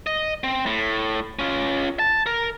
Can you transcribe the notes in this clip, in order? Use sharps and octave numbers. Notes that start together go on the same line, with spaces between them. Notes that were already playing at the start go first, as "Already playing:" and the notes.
D#5
C4
A2
C#4 F4
A5
A#4